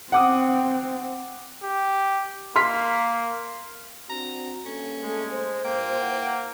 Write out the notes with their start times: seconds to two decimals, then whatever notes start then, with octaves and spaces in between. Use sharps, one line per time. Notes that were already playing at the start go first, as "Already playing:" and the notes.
0.12 C4 F#5 D6 D#6
1.63 G4
2.56 A#3 C6 F6 B6
4.10 C4 D4 F#4 A#5
4.66 G2 A#3 C#4 A4
5.03 G#3 A3
5.32 C5
5.65 G2 A#2 A#3 G5
5.99 E4 B4 F#5